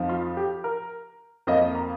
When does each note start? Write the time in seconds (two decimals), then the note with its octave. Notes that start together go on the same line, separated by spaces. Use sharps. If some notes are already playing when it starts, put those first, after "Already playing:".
Already playing: F2 F3 D#4
0.09 F4
0.37 G4
0.64 A#4
1.47 F2 F3 A#3 D#5
1.75 A#5